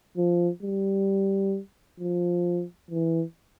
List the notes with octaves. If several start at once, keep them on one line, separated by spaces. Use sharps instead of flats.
F3
G3
F3
E3